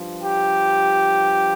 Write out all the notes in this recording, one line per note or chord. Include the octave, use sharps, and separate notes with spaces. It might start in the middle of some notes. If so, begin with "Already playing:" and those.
Already playing: G2 F3
G4